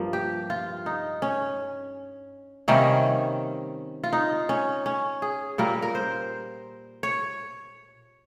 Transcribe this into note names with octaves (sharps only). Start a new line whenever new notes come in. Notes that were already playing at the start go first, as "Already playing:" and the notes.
Already playing: G2 F3 A#3
G4
F4
D#4
C#4
C3 D#3 G3 A#3 C#4
F4
D#4
C#4
C#4
G#4
A#2 G3 A#3 A#4
A#4
C5
C#5